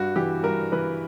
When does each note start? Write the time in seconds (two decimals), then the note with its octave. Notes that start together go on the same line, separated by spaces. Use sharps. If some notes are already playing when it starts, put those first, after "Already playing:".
Already playing: G2 F#4
0.16 E3 G4
0.43 G2 A#4
0.72 E3 B4